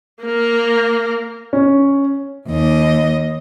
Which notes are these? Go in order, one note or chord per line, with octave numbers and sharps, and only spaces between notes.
A#3 A#4
C#4
D#2 D#5